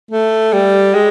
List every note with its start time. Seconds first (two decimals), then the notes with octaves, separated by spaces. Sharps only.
0.11 A3
0.53 G3
0.94 G#3